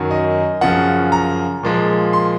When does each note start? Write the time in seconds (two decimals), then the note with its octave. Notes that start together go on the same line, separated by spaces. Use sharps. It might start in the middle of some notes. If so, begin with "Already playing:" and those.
Already playing: F#2 D#3 F#3
0.11 D#5
0.61 F#2 C#3 F3 F#5
1.12 A#5
1.63 A#2 F3 G#3
2.13 C6